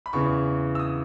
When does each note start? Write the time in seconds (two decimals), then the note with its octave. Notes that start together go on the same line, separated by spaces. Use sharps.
0.06 B5
0.13 E2 C#3 E3 C#6
0.75 E6
0.79 D#6